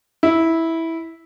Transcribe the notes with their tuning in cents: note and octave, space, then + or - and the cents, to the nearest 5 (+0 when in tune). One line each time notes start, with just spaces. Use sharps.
E4 -10